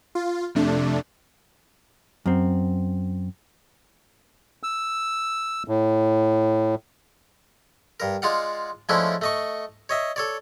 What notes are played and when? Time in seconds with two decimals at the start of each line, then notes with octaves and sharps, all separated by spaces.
0.15 F4
0.55 F2 C3 A3 D4
2.26 F#2 C4
4.63 E6
5.68 A2
8.00 G2 A#4
8.22 G#3 F4 D5 F5 F#5
8.89 F3 G#3 A3 C#4 D4 E4
9.21 A3 D#5 C#6
9.89 C#5 D#5 E5
10.16 A4 C#5 D5